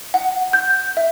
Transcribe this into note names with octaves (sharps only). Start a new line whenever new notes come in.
F#5
G6
E5